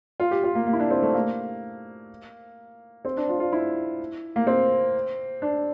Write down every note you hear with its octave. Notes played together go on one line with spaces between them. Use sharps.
F4
G4
F4
A#3
A#3
E4
D4
C4
A3
A#3
C4
D4
F4
F4
E4
A#3
C4
D4